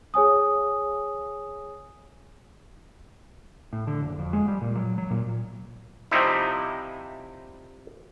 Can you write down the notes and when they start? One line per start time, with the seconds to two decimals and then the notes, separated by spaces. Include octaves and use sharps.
0.14 G#4 C#5 G#5 D#6
3.73 A2
3.87 D3
4.02 F#1
4.19 F2
4.33 G#3
4.48 G3
4.61 A#2
4.75 F#3
4.98 F#3
5.10 A#2
6.11 C3 F3 G3 C4 D#4 E4